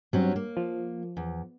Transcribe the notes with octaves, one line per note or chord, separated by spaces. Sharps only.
G2 F#3 C4 C#4
A#3
F3
E2